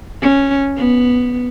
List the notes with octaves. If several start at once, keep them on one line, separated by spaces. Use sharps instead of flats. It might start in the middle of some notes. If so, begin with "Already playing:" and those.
C#4
B3